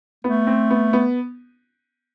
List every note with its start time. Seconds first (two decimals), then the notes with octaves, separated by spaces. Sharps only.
0.24 A3 B3
0.47 C4
0.70 B3
0.93 B3